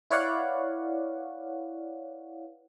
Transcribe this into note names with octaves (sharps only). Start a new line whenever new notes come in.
E4 B4 C#5 D5 F5 F#5